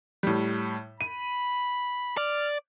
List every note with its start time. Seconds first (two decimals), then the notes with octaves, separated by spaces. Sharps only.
0.23 A2 G3
1.01 B5 D#7
2.17 D5 F6